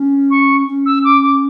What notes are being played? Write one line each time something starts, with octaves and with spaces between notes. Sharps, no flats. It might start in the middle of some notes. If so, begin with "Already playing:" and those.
Already playing: C#4
C#6
C#4
E6
D6
D6